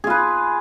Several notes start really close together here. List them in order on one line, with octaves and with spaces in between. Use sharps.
G#4 F4 B4